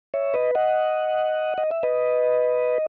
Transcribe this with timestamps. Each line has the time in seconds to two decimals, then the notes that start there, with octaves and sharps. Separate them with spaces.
0.14 C#5 E5
0.34 B4 D#5
0.55 D#5 F#5
1.58 D#5
1.71 E5
1.83 B4 D#5